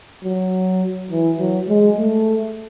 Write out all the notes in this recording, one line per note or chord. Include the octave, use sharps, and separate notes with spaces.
F#3
E3
F#3
G#3
A3